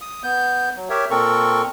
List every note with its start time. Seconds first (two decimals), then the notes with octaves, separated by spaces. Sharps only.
0.01 D#6
0.24 B3 G6
0.77 F#3
0.90 G4 A#4 C#5 E5
1.10 A#2 C4 A4 A#4 C#6